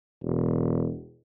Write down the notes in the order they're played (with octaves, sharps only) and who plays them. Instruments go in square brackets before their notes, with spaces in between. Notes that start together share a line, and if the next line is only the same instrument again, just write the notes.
[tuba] E1